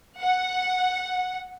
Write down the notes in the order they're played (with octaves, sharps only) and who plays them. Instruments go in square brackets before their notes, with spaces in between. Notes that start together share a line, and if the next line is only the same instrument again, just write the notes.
[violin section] F#5